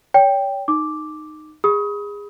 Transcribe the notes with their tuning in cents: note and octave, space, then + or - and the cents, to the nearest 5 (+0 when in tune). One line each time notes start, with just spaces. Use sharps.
C#5 +35 G5 +5
D#4 -15 D6 +0
G#4 -25 B5 +0 D#6 +25